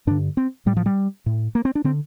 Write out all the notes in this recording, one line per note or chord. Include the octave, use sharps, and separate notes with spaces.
G2 D3 D4
C4
A2 G3
F3
G3
A2
A#3
C4
D4
D3 C4